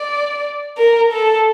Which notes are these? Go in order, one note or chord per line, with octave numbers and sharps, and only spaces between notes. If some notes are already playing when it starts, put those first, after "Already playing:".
Already playing: D5
A#4
A4